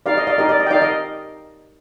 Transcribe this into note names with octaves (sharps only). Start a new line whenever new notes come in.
D#4 G4 A#4 D5 F5
D#5
D5 F5
D#4 G4 A#4 D#5
D5
D#5
G5
D#4 G4 A#4 D5 F5
D#5